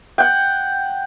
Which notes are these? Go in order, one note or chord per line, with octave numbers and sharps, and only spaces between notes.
F#5 G5